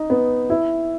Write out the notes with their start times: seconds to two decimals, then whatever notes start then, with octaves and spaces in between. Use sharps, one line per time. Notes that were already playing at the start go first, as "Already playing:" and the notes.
Already playing: D#4
0.10 B3
0.50 E4